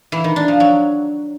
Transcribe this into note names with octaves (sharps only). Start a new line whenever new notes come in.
E3
D#3
D4
F3
F#3